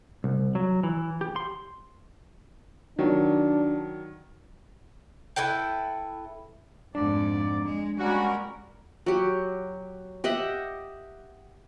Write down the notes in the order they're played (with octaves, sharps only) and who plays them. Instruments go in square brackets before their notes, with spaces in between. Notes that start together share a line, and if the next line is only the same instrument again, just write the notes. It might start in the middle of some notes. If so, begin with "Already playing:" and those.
[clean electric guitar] C2
F#3
E3
G4
C6
[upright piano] D#3 F#3 [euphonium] D4
[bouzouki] E4 A4 B4 G5
[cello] F2 G#2 [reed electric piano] D4 [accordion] D5
[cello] G#3
[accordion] G3 A#3 C#4 [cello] G#3 A#4 [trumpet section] F#4
[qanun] F#3 G4
G4 D#5 E5 F#5